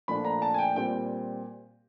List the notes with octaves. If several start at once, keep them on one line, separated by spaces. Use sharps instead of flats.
A#2 F3 A3 D4 F4 B5
A#5
A5
G#5
G5
A#2 G3 C4 G5